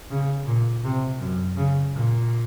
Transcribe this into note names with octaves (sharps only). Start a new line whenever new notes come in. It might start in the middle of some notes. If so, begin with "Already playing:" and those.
C#3
A#2
C3
F#2
C#3
A#2